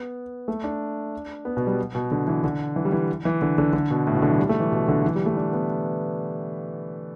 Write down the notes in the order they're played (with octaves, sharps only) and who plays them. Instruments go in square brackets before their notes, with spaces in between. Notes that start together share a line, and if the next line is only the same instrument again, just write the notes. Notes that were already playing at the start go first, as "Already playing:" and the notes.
Already playing: [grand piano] B3
A3
D4
B3
B2
G3
B2
D3
E3
D3
E3
G3
E3
E3
D3
D3
D3
B2
A2
B2
D3
E3
G3
A3
E3
B2
D3
E3
G3
A3
D4
B3